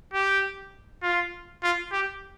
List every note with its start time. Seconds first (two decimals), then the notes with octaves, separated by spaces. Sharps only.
0.14 G4
1.03 F4
1.63 F4
1.92 G4